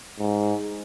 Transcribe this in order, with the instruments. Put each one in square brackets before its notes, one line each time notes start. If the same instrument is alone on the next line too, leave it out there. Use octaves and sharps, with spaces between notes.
[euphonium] G#2